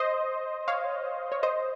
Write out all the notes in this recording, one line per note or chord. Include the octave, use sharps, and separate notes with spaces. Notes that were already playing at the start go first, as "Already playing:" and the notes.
Already playing: C5 D#5
C#5 F5
C#5
C5 D#5